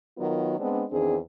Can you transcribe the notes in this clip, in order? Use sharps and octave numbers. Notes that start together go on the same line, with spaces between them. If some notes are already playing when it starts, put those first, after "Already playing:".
D#3 F#3 B3 F4 A#4
G#3 B3 C4 D4
E2 D#3 C4 D4 G#4